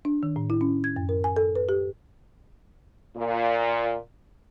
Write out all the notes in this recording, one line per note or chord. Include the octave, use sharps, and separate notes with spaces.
D4
D#3
A2
E4
C#4
G#6
F#2
A#4
G#5
A4
B4
G4
A#2